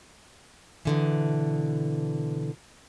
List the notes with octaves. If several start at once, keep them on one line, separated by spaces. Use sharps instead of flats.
B2 D3 E3